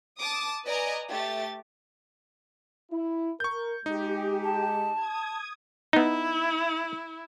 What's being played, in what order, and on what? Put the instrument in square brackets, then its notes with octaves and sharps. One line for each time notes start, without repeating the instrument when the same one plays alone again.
[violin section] A5 D6 D#6
B4 D5 D#5 G#5 A#5
A3 G4 A6
[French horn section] E4
[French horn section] A#4 [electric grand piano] C#6 G6
[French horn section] G#3 [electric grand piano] D#4 [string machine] G4
[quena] A5
[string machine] D#6 G#6
[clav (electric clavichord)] B3 D#4 [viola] E4